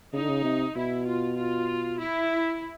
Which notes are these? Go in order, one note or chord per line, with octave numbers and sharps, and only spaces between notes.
C#3 D#4
D3
C#3
C3
B2 E4
F4
F4
E4